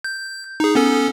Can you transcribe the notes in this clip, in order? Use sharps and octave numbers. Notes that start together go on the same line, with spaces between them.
G6
D#4 G#4
B3 C#4 A4